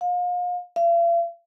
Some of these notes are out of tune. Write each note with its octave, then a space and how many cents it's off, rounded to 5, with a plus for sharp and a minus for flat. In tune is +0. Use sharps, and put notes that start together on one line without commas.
F5 +35
F5 -45